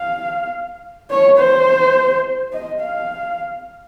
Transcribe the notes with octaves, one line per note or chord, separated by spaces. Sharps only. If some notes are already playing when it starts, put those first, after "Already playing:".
Already playing: F5
C#5
C5
D#5
F5